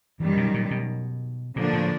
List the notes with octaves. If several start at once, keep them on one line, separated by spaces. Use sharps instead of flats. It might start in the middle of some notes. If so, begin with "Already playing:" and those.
F#2 D#3 E3 G3
B2
A#2
B2
A#2 D3 F3 A#3 D4
A2